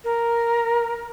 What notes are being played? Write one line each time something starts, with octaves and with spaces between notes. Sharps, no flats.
A#4